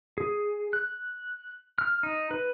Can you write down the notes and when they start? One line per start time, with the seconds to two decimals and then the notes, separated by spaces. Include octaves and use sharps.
0.18 G#4
0.73 F#6
1.78 F6
2.03 D#4
2.31 B4